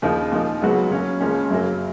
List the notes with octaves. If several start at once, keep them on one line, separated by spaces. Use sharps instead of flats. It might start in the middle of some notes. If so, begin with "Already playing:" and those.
D#2 C#3 F3 A#3 D#4
A#2 F3 A#3 D#4
C#2 C#3 F#3 B3 F#4
F#3 A#3 C#4
C#2 C#3 F3 A#3 C#4
F#2 C#3 F#3 A#3